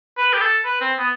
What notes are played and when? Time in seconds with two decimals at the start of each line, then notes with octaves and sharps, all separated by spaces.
0.18 B4
0.33 G4
0.41 A4
0.65 B4
0.81 C4
0.98 B3